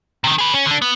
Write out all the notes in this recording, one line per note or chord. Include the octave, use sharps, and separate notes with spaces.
C3 D#3
G#4 B4
C#4
D3 D4
B3